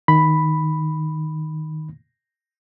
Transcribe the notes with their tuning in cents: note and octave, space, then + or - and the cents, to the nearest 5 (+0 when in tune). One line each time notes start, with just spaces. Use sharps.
D#3 +0 B5 +0